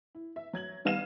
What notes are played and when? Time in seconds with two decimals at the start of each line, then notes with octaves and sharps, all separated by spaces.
0.15 E4
0.36 E5
0.53 F#3 G#6 F#7
0.85 D#3 G3 B3 F5 D#7 E7